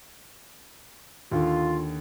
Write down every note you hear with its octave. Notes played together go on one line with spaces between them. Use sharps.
D#2 D3 F4